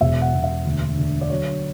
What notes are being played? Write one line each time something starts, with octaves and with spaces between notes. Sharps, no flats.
E1 E5
F#5
E1
E5
D2
D3
D5
F#3 C#5